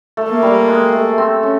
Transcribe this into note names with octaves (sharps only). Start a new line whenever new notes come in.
A3
A#3
G3
G#3
A3
C4
C#4